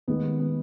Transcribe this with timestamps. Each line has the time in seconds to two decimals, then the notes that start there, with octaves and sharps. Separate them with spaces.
0.08 D#2 D#3 G#3 B3
0.39 B3